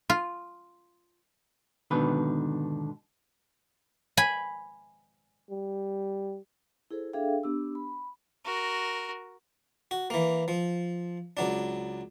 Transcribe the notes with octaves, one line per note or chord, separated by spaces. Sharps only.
F4
G#2 B2 D3 D#3 B4
G#5 B5
G3
E4 G#4 A4 C5
D4 G#4 A4 E5 F5 G5
B3 D4 G4 E6
B5
F#4 A#4
F#4
E3 A#3
F3
C#2 F#3 D4